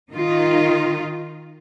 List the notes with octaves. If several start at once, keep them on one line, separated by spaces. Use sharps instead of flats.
D#3 D#4 F4